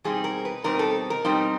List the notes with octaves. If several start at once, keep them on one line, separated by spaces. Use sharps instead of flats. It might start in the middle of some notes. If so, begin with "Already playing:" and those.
B2 G3 C4 D#4 G#4
A#4
B4
B2 G3 C4 D#4 A#4
A4
A#4
B2 G3 C4 D#4